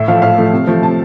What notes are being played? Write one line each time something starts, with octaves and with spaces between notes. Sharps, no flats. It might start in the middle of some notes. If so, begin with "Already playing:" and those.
Already playing: A2 E5
F3 A3 F5
A2 F5
F3 A3
C3
F3 A3
C3 A5